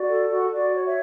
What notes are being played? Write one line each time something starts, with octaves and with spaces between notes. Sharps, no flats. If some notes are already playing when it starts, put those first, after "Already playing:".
Already playing: F#4 D5
A4
F#4
F#4 D5
C#5
C#5 E5